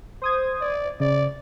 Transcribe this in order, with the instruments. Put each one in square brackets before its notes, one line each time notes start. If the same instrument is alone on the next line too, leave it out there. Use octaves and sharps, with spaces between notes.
[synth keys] C5 D#6 G#6
[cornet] D5
[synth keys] C#3 [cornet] D5